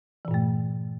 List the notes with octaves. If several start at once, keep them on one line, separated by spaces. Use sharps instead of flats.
G2 A#2 E3 A3